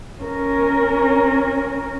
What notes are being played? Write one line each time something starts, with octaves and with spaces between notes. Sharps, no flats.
C#4 A#4